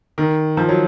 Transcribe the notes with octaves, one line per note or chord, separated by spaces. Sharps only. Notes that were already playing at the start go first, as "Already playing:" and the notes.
D#3
F3
F#3